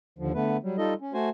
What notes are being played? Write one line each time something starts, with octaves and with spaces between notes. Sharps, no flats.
D#2 D3 F3
D3 A3 B3 B4
F#3 G3
G3 D#4 F4 A4 D#5
C#4
A3 F#4 C5 G#5